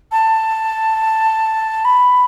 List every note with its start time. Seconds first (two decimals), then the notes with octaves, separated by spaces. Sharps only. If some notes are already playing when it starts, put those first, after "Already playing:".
0.12 A5
1.85 B5